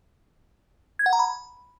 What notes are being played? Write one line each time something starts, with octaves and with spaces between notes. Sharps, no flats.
G#6
F#5
A#5
B5